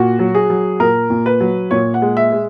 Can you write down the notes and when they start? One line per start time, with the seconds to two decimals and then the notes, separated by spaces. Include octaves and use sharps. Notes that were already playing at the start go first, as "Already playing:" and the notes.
Already playing: A#2 F#4
0.19 F#3
0.35 G#4
0.50 F#3
0.80 A#2 A#4
1.10 A#2
1.26 B4
1.40 F#3
1.71 A#2 C#5
1.94 F#5
2.02 G#3
2.17 E5
2.32 G#3